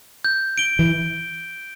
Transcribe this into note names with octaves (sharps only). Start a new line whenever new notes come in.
G6
D7 G7
E3